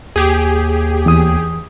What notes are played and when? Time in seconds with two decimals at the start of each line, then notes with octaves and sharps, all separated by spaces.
0.16 D#2 G4 G#4
1.06 E2 D#6